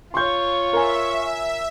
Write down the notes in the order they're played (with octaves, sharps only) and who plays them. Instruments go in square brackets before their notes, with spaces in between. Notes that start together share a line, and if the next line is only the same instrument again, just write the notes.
[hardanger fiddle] F4 C#5 [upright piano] C6 G6 [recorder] C#6
[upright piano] A#4 G#5 [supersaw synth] E5